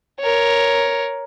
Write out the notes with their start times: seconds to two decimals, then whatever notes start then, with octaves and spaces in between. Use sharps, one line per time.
0.21 A#4 C#5